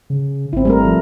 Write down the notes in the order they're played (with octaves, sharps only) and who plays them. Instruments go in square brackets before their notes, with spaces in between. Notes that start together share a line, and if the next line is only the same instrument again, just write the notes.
[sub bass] C#3
[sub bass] G#1 [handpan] C4 E4
[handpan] G3 A3 A#4
F3